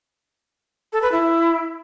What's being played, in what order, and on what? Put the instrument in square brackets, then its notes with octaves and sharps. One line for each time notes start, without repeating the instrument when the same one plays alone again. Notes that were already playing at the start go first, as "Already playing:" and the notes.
[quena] A4
B4
E4